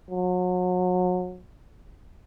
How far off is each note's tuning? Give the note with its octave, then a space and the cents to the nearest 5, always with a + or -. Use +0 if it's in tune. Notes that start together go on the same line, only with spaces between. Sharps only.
F#3 -35